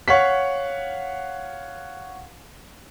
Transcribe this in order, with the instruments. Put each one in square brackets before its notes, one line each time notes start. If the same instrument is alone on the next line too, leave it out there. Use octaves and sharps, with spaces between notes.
[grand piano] C#5 F5 F#5 B6